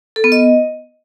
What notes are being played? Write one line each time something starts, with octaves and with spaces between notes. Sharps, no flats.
A4
B3
D#5